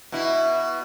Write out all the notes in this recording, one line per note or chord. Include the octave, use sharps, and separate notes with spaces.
B2 E4